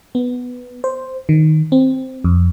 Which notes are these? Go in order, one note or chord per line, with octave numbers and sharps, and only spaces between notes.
B3
C5
D#3
C4
F2